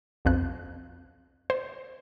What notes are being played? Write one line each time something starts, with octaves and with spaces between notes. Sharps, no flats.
B1 F2 F#6
C5